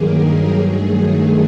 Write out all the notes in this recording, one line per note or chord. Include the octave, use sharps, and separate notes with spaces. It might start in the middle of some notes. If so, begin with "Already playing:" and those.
Already playing: G2 D#3 F#3 A#3 G4 G#4 A#4
G2 D#3 F#3 A3 G#4